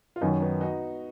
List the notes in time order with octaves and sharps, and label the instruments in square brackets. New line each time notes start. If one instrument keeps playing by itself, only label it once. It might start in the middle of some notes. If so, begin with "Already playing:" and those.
[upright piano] F4
[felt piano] F#2 D#3 F#3 [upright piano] B3 D#4
[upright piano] B3 D#4
D#4 F#4